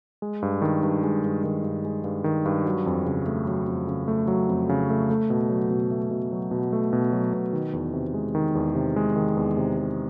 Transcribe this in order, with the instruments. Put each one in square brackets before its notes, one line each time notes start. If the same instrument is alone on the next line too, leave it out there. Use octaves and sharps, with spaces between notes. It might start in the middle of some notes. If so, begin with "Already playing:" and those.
[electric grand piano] G#3
G2
D#3
G2
G#3
G2
D#3
G2
G#3
G2
D#3
G2
F#3
F2
C#3
A3
F#3
F2
C#3
A3
F#3
F2
C#3
A3
A3
B2
F#3
B2
A3
B2
F#3
B2
A3
B2
F#3
B2
D#3
E2
C3
G#3
D#3
E2
C3
G#3
D#3
E2
C3
G#3